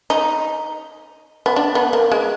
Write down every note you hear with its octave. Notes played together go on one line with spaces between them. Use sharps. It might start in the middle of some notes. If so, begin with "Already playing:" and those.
D#4
B3
D4
B3
A#3
G#3